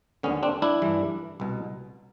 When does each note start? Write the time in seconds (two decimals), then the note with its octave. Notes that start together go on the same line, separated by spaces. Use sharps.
0.23 D#2 D3 B3 C#4
0.43 C4 D4
0.62 D4 E4
0.82 G2 E3
1.40 C2 B2